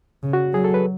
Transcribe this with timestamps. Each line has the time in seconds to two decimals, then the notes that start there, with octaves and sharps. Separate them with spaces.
0.23 C#3
0.33 F#4
0.54 F#3 G#4
0.64 A4
0.74 B4